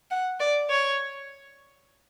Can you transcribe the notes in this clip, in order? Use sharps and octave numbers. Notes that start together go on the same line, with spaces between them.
F#5
D5
C#5